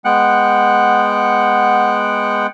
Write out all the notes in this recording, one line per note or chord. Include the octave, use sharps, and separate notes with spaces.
G#3 B3 F#5 G5 F#6